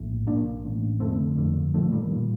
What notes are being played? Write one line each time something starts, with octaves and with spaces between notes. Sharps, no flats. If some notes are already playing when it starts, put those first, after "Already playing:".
Already playing: A#1 A2
A#1 A#2 A#3 D4
A1 A2
F1 F2 D3 A3 C4
G1 F2 D3
A#1 A#2 F3 A3
D#3 G3
A#2